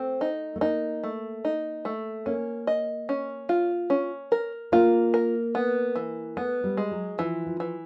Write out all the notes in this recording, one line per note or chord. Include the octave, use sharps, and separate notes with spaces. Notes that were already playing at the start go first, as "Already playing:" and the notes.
Already playing: A3 C4
D#4
A3
A#3 D#4
A3
D#4
A3
A#3 C#4
D#5
C#4
F4
C#4
A#4
A#3 F4
A#4
B3
E3
A3 B3
G3
G#3
F#3
E3 F3
F3
E3